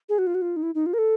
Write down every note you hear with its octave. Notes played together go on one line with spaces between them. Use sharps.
G#4
F#4
F4
F#4
F4
D#4
E4
D#4
F4
A#4
A4